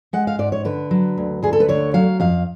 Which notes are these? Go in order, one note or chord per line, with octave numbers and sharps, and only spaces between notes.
G#3 F#5
F5
G#2 D5
C#5
D3 B4
F#3
D2
D2 G#4
A4
B4
D3 C#5
F#3 F5
F2 F5